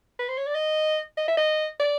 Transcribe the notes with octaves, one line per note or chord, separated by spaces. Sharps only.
B4
C5
C#5
D5
D#5
D#5
E5
D#5
D5